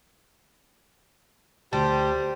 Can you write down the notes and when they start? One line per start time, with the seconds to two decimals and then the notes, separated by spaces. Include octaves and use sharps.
1.73 D2 G3 G4 C5 A5